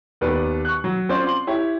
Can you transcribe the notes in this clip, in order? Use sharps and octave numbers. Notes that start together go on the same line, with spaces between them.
D#2 B3 B4 D5
C#6 F#6
F#3
C4 C#4 F4 C5 D5
C6 F#7
E4 G4 C#5